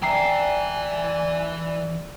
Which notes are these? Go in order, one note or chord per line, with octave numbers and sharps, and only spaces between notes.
E3 D5 E5 G5 G#5 A#5 C7